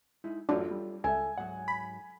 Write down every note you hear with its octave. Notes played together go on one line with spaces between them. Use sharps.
G#3 D#4 E4
A1 F#2 D4 F4 A4 C#5
G3
C#2 A4 E5 G#5
G#2 F#3 F#5
B5